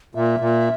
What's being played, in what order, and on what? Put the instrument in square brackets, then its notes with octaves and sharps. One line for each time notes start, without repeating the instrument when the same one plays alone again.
[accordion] A#2 [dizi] E5
[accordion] A#2